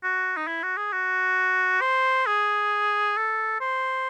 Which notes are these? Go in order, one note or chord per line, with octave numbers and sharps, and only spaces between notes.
F#4
D#4
E4
F#4
G#4
F#4
C5
G#4
A4
C5